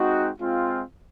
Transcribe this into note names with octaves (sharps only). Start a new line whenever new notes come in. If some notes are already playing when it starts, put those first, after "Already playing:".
Already playing: G#3 C4 D#4 F#4
G#3 C4 F4